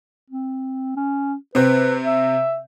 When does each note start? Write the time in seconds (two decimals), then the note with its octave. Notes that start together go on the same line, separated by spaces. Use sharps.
0.30 C4
0.96 C#4
1.55 C3 C4 B4
2.05 E5